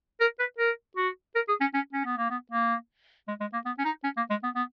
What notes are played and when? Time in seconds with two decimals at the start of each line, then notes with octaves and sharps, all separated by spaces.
0.20 A#4
0.39 B4
0.59 A#4
0.97 F#4
1.35 A#4
1.49 G#4
1.61 C#4
1.74 C#4
1.93 C#4
2.05 B3
2.18 A#3
2.30 B3
2.52 A#3
3.28 G#3
3.40 G#3
3.53 A#3
3.65 B3
3.78 C#4
3.85 D#4
4.04 C#4
4.17 A#3
4.30 G#3
4.43 B3
4.55 B3